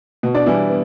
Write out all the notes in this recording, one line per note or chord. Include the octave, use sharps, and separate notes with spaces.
B2
D4 D5
E3 G3 E4
B3